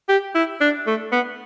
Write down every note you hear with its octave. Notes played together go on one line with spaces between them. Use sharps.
G4
E4
D4
A3
B3